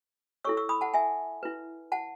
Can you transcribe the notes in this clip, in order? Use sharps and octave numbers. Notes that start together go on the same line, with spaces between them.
E4 A4 C#5 C#6 E6
C#6 E6
B5 D#6
F#5 A5
E5 G#5
E4 B4
F#5 A5